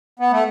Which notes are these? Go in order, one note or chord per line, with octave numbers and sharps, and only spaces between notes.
B3
A3